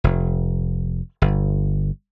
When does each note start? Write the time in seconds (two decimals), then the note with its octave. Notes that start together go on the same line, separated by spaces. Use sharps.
0.04 F1
1.22 G1